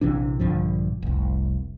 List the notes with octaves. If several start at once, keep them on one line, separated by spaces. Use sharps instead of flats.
A#1 C3 E3 D4
A#1 G2 D3 F3
F1 C2